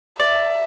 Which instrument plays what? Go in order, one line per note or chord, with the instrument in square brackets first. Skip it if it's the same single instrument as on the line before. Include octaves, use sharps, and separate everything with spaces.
[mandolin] D5 [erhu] E5